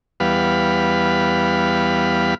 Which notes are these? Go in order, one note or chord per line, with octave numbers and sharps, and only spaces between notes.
E2 G3 B3 F5 B5